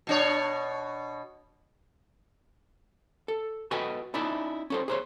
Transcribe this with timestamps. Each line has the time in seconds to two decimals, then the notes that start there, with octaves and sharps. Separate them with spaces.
0.07 B2 D4 C#5
3.28 A4
3.71 F#4 A4 B4 D#5 G5 G#5
4.14 C#4 D#4 E4 D5 E5 A5
4.70 C#4 A4 C5
4.88 G#4 C5 C#5